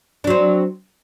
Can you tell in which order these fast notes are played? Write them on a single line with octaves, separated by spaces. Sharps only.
D4 F#3 C4